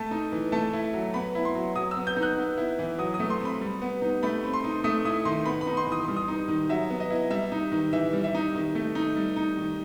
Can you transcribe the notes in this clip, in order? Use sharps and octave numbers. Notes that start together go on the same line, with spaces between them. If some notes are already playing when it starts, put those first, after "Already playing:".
Already playing: A3 A5
D#4
E3
A3 A5
E4
F#3
B3 B5
E4
C6
F#3
F#3 D#6
E6
B3
G6
D#4
F#6
B3
E4
E3
F#3 D#6
D#6
A3
C6
C4 B5
G3
B3
D#4
A3 B5
C4
C6
D#4
A3 D#6
E4 D#6
D#3 C6
B3 B5
B5
D#4
C6
E3 D#6
G3 C6
D#6
D#4
D#3
F#3 E5
B3
D#5
E4
G3 E5
D#4
D#3
E3 E5
G3
E5
D#4
D#3
A3
D#4
G3
D#4
D#3